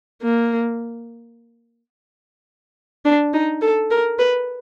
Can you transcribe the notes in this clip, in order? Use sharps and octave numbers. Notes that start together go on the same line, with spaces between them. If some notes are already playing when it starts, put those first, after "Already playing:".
A#3
D4
D#4
A4
A#4
B4